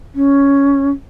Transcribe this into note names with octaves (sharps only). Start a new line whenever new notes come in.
C#4